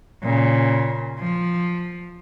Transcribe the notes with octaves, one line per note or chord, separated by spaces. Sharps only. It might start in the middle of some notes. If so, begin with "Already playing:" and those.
A#2 C#3
F3